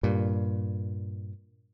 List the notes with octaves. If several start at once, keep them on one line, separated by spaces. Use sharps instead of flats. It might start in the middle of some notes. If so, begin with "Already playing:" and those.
G2 A#2